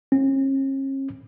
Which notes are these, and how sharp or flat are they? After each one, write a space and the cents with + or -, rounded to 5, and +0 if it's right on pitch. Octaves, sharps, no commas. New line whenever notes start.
C#4 -40